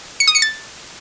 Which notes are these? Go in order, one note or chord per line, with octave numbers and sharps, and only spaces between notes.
C#7
D#6
C#7
A6